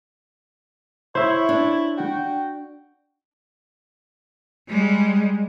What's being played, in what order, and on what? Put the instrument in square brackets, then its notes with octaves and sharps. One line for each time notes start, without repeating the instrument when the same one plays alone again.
[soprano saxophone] E4 [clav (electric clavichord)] C5 E5 [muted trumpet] C#5
[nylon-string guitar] D4
[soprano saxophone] F#4 [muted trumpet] G5
[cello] G3 G#3